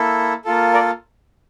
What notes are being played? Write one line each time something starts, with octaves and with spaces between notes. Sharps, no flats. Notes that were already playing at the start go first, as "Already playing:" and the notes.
Already playing: A#3 E4 A4
A#3 F4 A4
A#4 D5